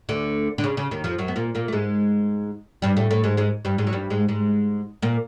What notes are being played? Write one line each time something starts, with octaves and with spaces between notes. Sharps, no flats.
D2 D3
D3
C#3
C#3
D#2 D#3
F2 F3
F#2 F#3
B3
A#2 A#3
A#2 A#3
A3
G#2 G#3
G2 G3
A2 A3
A2 A3
G#2 G#3
G#2 G#3
G2 G3
G#2 G#3
F#3
G2 G3
G#2 G#3
G#2 G#3
A#2 A#3